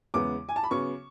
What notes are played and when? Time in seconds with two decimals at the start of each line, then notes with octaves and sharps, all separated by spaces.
0.14 E2 C#3 G#3 B3 D6
0.49 G#5
0.56 A5
0.63 B5
0.71 C#3 F#3 B3 C#6